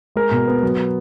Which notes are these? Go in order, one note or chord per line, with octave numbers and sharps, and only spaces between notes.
G#3 A#4
B2
B3
F#3